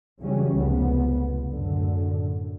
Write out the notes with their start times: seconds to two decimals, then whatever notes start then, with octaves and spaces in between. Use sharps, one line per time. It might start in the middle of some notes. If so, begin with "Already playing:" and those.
0.21 C#3 E3 F#3 G3 C#4
0.55 F1 C#2 F3 B3
1.50 F#2 A2 D3